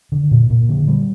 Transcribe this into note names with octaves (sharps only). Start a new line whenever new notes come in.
D3
A#2
A#2
D3
G3